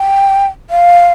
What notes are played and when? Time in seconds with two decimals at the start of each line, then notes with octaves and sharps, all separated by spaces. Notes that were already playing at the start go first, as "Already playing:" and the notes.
Already playing: G5
0.70 F5